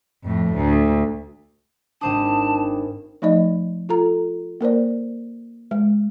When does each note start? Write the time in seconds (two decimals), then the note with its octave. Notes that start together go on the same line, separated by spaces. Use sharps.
0.24 F2 A2
0.54 D2
2.01 G#1 C4 D4 C5 G5 A5 D#6
3.22 F3 A3 D#4 D5 D#5
3.89 F4 A4 A#5
4.61 A#3 A#4 C5 D5
5.71 G#3